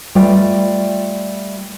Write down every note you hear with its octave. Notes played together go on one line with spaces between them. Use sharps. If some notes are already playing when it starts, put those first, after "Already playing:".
G3 A3 F4 B4 D5 G5